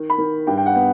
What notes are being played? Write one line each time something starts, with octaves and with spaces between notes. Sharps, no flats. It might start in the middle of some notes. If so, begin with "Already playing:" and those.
Already playing: D#3
B5
D#3
G2 G5
G5
F#5
B3